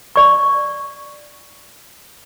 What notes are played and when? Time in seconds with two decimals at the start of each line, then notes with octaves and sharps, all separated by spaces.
0.16 D5 C#6